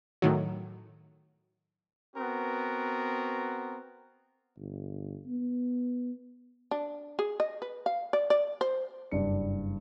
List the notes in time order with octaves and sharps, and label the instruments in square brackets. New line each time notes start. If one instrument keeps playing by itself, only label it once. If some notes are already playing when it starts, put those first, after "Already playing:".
[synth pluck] A2 D#3 F#3
[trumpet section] B3 C4 F#4 A#4
[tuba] G1
B3
[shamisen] D4
G#4
D#5
B4
F5
D5
D5
C5
[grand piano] F#1 G2 D4 C#7